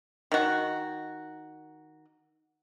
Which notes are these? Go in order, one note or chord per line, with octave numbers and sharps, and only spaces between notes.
D#3 F#4